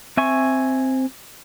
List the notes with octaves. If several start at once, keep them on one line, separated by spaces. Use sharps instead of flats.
C4 E5 G#5 C#6